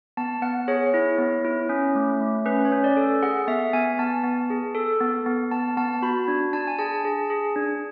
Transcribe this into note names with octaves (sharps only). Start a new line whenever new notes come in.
B3 A5
B3 F#5
G#4 C#5
E4
B3
E4
C#4
A3
A3
C#4 B4
C#5
C#4
D5
A4
G#4 F#5
B3 E5
B3 G#5
B3 A5
B3
G#4
A4
B3
B3
B3 A5
B3 A5
F#4 B5
D4
D4 A5
G#5
G#4 A5
G#4
G#4
D4